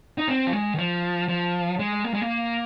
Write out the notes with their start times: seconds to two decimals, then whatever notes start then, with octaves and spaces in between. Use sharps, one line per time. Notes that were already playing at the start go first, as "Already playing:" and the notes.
0.18 D#4
0.28 C4
0.47 F3
0.53 G#3
0.74 D#3
0.78 F3
1.28 F3
1.79 G#3
2.04 A#3
2.14 G#3
2.22 A#3